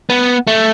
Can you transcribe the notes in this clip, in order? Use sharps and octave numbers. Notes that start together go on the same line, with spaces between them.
B3
A3